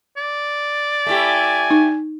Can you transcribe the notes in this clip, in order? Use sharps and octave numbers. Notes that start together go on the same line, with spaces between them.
D5
A3 E4 G4 G#5
D#4